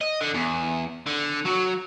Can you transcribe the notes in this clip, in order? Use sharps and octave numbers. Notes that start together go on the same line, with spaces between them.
D#5
D3
E2
D3
F#3